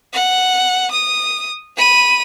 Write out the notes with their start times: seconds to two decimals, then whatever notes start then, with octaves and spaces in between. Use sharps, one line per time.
0.13 F#5
0.91 D#6
1.77 B5 D#7